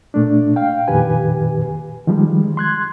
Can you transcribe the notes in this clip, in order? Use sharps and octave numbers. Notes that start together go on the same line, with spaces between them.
A#2 A3 D4
F5 G5
F2 A#2 D#3 G4 B4 G#5
D#3 F3 G3 G#3
C6 F#6 G#6